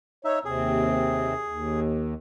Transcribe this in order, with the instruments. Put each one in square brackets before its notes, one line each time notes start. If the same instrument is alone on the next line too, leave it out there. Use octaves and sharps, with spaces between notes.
[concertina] D#4 E5 [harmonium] C#5
[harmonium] D#2 C3 C4 [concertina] G#4
[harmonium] D#2